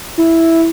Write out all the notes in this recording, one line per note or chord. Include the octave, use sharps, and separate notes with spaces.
E4